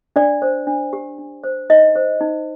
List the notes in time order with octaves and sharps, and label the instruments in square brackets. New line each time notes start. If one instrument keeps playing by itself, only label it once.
[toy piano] D4 D5
C5
D4
G4
D4
C5
D#4 D#5
C5
D#4